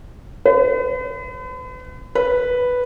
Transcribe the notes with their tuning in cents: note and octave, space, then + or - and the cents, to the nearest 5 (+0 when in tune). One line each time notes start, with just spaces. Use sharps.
B4 +45
B4 +0